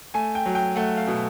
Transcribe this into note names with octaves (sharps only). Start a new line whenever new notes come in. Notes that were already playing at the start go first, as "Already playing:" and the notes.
A3 G#5
G5
F#3
G5
A3 F#5
F5
B2